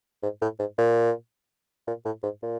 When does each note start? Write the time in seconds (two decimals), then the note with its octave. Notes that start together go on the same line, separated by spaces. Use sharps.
0.23 G#2
0.42 A2
0.59 G#2
0.78 A#2
1.87 A#2
2.05 A2
2.23 G#2
2.43 A#2